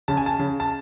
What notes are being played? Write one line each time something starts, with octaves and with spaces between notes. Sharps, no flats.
C#3 A5
G#5
A5
C#3
A5